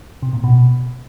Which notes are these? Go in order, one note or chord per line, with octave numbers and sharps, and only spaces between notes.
C3
A#2
B2